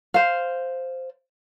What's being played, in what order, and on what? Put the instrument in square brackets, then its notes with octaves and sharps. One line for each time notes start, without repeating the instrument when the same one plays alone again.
[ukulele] C5 F5